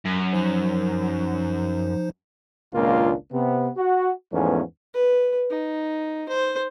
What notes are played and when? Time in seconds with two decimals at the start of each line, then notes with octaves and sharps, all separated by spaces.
0.06 F#2
0.33 F3 D#4 C5
2.74 G#1 C#2 A#2 A#3 D4 F4
3.33 C3 B3
3.77 F#4
4.33 E2 G#2 F3 A3 B3 C#4
4.94 B4
5.50 D#4
6.29 C5